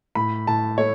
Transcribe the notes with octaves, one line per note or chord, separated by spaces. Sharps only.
A2 B5
A2 A5
A3 C#5